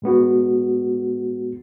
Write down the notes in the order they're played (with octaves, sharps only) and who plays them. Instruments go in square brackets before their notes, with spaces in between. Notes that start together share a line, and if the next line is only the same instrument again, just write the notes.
[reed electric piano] A2 G#3 B3 F#4